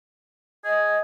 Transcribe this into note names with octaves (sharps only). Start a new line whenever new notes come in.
G#4 D#5